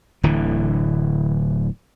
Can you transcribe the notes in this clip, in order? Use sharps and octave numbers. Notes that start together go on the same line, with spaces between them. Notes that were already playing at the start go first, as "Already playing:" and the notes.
D1 D3 E3